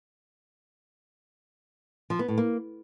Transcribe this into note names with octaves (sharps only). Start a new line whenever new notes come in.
F3
B3
A2
A#3